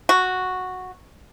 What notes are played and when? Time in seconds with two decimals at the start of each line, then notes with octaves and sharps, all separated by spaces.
0.09 F#4